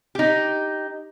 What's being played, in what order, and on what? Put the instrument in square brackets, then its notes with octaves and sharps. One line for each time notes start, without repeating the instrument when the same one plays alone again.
[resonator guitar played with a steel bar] D#4 G4